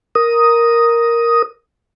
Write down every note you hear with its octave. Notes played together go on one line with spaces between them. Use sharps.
A#4 D#6